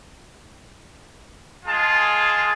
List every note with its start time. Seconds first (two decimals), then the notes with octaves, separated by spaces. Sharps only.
1.65 G#3 F4 G#4 A5